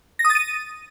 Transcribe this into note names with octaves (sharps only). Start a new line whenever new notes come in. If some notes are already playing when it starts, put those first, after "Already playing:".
A#6
D#6
A6
D#7